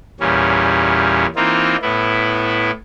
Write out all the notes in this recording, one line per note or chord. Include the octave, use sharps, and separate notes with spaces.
E2 A#2 G3 C#4
E3 A#3 C4 D#4 F4
A2 B3 E4